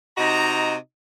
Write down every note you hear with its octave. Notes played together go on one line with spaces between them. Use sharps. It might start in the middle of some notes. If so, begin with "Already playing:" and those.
C3 D#4 F#4 D#5 A#5